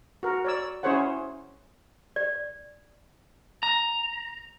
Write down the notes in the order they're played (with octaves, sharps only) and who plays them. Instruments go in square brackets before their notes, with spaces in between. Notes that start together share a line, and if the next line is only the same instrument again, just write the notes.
[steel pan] F#4 A#4
C#5 D5 E6
C#4 E4 G#4 C5 C#5 F#5
[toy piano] D5
[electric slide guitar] A#5